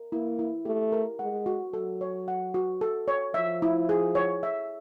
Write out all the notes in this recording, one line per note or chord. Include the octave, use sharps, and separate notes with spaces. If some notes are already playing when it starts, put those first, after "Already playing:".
Already playing: A#4
A#3 E4
E4
A3 G4
A#4
G#3 F#5
F#4
F#3 A4
C#5
F#5
F#4
A4
C#5
F3 E5
E4
G#4
C#5
E5